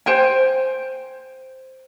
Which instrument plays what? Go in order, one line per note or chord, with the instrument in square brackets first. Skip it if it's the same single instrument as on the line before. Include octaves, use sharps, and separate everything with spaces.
[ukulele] C5 G5 G#5